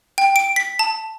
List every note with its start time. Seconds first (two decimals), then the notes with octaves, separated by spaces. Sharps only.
0.18 G5
0.36 D7
0.56 B6
0.79 A5